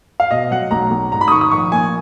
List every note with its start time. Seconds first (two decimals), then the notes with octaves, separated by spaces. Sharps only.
0.20 F5
0.31 B2 D#5
0.51 F#3 F#5
0.71 B1 A#5
0.91 B1
1.12 G#2 A#5
1.21 B5
1.28 D#6
1.32 D#3 C#6
1.41 D#6
1.51 A#1 C#6
1.72 A#3 G#5